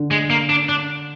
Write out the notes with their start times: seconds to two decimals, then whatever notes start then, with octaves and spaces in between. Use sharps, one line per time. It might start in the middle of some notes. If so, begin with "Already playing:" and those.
Already playing: D3
0.11 G#3
0.30 A#3
0.49 D4
0.69 D4